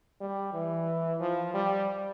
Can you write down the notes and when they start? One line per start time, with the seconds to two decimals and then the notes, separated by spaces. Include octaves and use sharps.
0.21 G3
0.53 E3
1.21 F3
1.54 G3